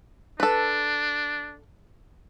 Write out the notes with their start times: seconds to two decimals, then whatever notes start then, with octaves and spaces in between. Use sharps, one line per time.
0.40 D4 A4 B4